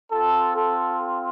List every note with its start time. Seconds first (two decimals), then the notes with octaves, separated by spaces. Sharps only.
0.12 C4 F4 A4
0.57 A4